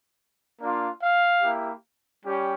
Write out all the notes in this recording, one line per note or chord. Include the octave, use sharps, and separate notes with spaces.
A#3 D4 F4
F5
A#3 E4 G4
G3 C#4 G4